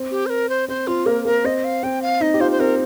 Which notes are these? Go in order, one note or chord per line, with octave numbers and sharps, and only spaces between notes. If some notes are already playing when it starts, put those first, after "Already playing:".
Already playing: C4
G4
C5
A#4
C5
C4 C5
C4 F4
A#3 A#4
A#3 A#4
C4 D#5
F5
C4 G5
F5
D#4 D#5
G4
F4 C5
C5
C4 A#4